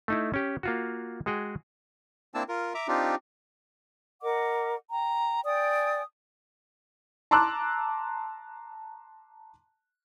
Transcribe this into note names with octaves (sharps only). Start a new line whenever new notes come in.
A3 D#4 E4
C#4 G4
A#3 F4 F#4
G#3 F#4 G#4 G5
A#3 C4 D4 E4 A5 E6
F4 A#4
E5 A#5 D6
C4 D4 D#4 F4 G4
A#4 D#5 F#5 D6
G5 A#5
D5 G5 G#5 D#6
A5 A#5 C6 D6 E6 F#6